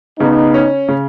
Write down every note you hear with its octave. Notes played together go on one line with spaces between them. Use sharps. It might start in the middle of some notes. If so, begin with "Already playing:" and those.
C#3 B3 D#4
C#4
C#3